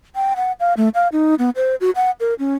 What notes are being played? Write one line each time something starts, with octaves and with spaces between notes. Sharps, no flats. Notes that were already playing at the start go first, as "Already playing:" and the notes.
G5
F#5
F5
A3
F5
D#4
B3
C5
F#4
F#5
A#4
C#4